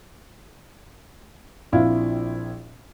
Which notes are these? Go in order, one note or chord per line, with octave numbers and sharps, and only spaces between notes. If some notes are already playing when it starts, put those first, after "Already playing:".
A#1 C4 E4 F4 F5